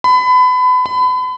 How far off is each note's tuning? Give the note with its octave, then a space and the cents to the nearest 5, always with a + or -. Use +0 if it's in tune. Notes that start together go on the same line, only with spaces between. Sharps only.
B5 +30
B5 +35